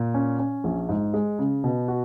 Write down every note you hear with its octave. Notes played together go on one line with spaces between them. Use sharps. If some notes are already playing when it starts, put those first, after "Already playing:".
Already playing: A#2
C#4
C#4
A#1
G#2
G#3
C#3
B2
F#4